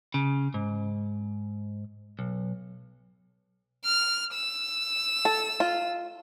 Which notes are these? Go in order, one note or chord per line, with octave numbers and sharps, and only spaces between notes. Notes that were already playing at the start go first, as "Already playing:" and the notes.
C#3
G#2
B1
F6
E6
A4
F4